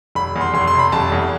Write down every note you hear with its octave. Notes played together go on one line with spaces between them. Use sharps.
F1 B5
E2
C6
F1 C6
C6
C3
B5
F1 A5
E2